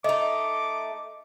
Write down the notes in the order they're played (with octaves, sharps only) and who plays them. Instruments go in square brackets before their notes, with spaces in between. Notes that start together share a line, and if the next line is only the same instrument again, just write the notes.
[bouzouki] A3 D#4 [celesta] D#5 [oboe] D6